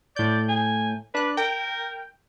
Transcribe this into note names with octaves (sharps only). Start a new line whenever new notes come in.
A2 D5 G6
G#5
D4 B4 F#6
A#4 G5